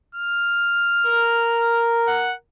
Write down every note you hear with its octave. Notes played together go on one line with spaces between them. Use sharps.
F6
A#4
F#5